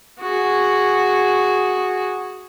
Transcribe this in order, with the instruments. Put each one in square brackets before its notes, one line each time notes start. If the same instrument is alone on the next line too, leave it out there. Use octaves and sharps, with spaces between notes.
[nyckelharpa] F#4 G#4